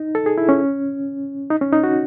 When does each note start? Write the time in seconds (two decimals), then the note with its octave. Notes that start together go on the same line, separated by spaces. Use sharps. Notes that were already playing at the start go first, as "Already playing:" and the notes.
Already playing: D#4
0.15 A4
0.26 G#4
0.38 E4
0.49 C#4
1.50 D#4
1.61 C#4
1.73 D#4
1.84 F#4